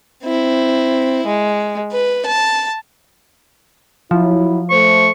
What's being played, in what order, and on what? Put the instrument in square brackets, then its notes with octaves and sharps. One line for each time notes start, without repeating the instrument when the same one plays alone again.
[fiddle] C4 E4
G#3
B4
A5
[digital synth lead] F3 [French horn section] F#3 E4
[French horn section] A3 C5 [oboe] C#6